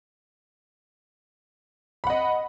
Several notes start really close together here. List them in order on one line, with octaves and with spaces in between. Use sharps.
B5 F#5 D#5